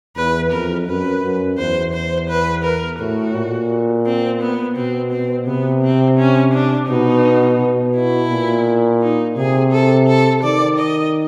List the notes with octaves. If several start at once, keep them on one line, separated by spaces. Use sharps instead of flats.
E2 B4
F2 A#4
F#2 B4
F#2
E2 C5
C5
B4
A#4
A2 F#4
A#2
C4
B3
B2 C4
C4
C3 B3
C4
C#4
D4
B2 D#4
B2
E4
A#2
D#4
C3 G#4
A4
A4
D#3 D5
D#5